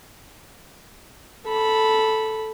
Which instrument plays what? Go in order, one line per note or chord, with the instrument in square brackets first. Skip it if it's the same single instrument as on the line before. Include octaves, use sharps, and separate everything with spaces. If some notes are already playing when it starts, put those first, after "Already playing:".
[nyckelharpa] A4 B5